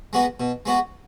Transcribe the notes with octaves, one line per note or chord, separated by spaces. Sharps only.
G#3 B3 F#4
B2
G#3 B3 F#4